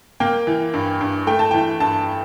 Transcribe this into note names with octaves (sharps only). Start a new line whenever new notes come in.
A#3 G5
E3
G2
G2
A3 G5
A5
E3 G5
G2 A5